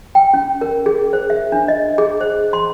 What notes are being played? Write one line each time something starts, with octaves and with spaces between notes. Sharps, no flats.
G5
C#4
A#4
G#4
C5
E5
D4
D#5
G#4
C5
C6